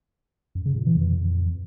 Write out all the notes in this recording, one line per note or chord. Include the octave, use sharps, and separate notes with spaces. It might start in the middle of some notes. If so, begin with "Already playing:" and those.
F#2
C#3
A#2
E3
F2